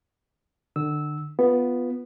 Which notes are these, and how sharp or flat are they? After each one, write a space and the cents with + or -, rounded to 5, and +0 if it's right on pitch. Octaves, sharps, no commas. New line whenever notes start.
D3 +30 E6 -15
B3 +0 F4 +0